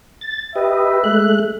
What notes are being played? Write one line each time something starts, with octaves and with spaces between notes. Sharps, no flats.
A6
G4 B4 D#5 E5
G#3 A3 F#6